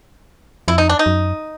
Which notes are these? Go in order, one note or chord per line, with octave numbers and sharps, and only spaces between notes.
F2 E4
D#4
D4
D#4
F#2